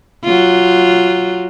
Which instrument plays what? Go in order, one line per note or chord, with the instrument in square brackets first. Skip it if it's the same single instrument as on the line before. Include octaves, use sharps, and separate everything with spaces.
[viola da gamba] F#3 F4